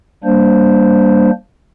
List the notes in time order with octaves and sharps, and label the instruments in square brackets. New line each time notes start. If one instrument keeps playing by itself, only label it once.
[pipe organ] G3 A#3 D4 C5